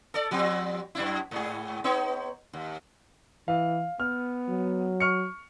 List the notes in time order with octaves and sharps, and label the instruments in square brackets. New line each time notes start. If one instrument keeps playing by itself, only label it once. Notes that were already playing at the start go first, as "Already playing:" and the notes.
[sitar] A4 D5
F3 G3 C4
F#2 D4 E4
G#2 G#4
B3 D#4 C#5
D#2
[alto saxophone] E3 [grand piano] F5
[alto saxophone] B3 [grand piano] F6
[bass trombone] F#3
[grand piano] C#6 F6 C#7